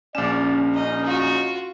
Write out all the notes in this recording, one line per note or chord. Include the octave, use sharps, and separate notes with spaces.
A#1 C#4 D5 E7
D#4 D#5
F4 F#4